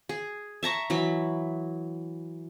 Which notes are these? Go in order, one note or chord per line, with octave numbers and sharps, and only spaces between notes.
G#4
E5 A5 A#5 C#6
E3 F#3 B5